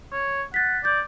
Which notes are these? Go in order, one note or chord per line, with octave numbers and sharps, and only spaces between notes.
C#5
F#5 A6 B6
D5 G6 A6